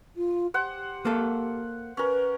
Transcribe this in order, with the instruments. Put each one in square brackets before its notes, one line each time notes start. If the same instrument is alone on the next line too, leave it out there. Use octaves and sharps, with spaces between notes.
[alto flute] F4
[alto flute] G4 [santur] C5 F#5
[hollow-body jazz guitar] A#3 A4
[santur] C#4 A#4 [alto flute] B4